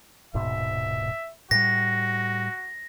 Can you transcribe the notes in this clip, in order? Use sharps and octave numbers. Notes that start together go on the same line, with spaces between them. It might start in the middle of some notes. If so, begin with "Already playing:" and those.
D#1 G#2 B2 E5
A2 G3 F#4 A#6